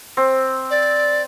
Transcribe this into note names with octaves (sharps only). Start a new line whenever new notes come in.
C4
D5